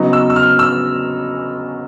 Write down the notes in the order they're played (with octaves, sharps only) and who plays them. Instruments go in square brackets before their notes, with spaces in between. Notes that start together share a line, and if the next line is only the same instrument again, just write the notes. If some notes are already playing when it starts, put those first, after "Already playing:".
Already playing: [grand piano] C#3 F#3 B3 D#4
E6
E6
F6
E6